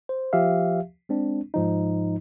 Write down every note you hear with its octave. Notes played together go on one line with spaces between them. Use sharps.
C5
F3 G4 E5 F5
G#3 C4 D4
G#2 F3 D#4